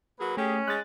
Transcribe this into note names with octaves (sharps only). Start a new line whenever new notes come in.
F#3 A#3 G#4 B4
A3 C#4 G4 G#4
G#3 F#6 A6